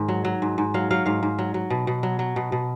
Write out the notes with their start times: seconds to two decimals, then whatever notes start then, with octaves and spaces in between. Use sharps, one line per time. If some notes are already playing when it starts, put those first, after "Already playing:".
Already playing: G#2 D#3
0.08 F#3
0.25 F#3
0.42 G#2
0.58 G#2
0.74 F#3 F5
0.91 F#3 F5
1.06 G#2 F5
1.23 G#2
1.38 F#3
1.54 F#3
1.70 B2
1.87 B2
2.03 F#3
2.19 F#3
2.36 B2
2.52 B2